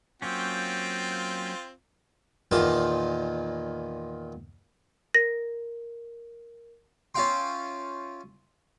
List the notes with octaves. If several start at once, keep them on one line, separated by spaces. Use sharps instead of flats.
F#3 A#3 C4 C#4 F4 G5
E2 A#2 D#3 F4 A5
A#4 A#6
C#4 F4 E5 F5 G5 C6